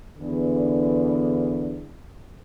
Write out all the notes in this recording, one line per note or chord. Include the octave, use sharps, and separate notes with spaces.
E2 D3